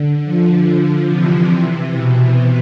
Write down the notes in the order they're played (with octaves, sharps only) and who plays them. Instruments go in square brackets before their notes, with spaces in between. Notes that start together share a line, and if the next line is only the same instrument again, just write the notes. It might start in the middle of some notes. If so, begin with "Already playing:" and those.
Already playing: [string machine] D3
D3 F3
C3 E3
B2